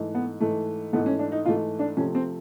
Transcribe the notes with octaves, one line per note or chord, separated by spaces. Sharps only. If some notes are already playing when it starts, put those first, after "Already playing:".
Already playing: G#2 E3 A3
B3
G#2 E3 A3
G#2 E3 A3 B3
C#4
D4
D#4
G#2 E3 A3 F4
D4
C3 F3 A3 C#4
C4